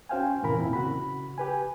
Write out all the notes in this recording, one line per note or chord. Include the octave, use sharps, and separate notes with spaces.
C#4 F#4 C5 F5 G5 G#5
F2 A2 C3 E3 A#4 B5
A#2 C4 E4
C#3 F#4 B5
G4 B4 G#5